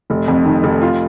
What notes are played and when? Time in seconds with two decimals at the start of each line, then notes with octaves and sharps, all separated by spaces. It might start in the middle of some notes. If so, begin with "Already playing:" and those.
0.10 F1
0.28 F2
0.45 D#3
0.63 F1
0.82 F4